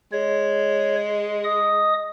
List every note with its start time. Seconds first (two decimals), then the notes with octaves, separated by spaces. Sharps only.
0.13 G#3 C#5
1.44 D#5 D#6